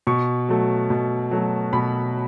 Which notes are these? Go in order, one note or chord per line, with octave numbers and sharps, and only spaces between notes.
B2 C#6
F#3 A3
B2
F#3 A3
B2 B5